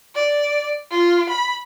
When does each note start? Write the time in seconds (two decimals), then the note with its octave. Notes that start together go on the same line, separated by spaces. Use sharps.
0.15 D5
0.91 F4
1.29 B5